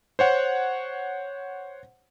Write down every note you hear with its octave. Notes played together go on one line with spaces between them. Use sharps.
C5 C#5 F#5